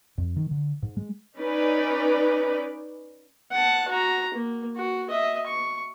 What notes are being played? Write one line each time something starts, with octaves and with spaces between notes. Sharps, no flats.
F2
D#3
D3
G#2
G#3
C#4 D#4 B4 D5
F#5 A5
F#4 A#5
A#3
F#4
D#5 E5
C#6